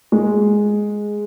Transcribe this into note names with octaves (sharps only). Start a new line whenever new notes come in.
G#3